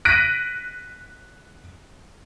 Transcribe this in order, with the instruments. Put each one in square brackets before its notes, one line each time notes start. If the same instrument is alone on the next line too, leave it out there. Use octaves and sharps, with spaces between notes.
[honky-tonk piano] F#6 A#6 B6 D7 D#7